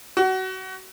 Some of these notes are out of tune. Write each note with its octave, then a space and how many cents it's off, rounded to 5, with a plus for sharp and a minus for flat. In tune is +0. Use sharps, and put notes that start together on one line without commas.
F#4 +25